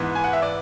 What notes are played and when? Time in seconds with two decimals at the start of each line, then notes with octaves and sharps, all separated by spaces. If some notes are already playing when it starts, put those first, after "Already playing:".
Already playing: G#2 E3 B3
0.15 G#5
0.24 F#5
0.33 E5
0.42 D5